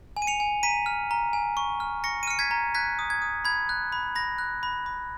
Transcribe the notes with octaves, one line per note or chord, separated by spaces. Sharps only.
G#5
D#7
C#7 F7
G#5
A#5 B6 D#7
F6
A#5
G#5
C#6
F6
C#6 A#6 C#7
D#7
F6 C#7
G#6 B6
A#5
F#6 G#6 B6
D#6
G#6
D#6
B5 G#6
F#6
B5
B5 A#6
F#6
B5
B5